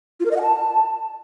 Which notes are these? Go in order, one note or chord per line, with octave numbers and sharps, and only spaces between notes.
F4
A#4
D#5
F#5
A5